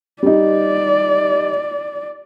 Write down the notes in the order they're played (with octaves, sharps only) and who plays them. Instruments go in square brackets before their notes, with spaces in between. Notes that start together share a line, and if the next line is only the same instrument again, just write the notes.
[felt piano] G3 D#4 [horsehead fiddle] D5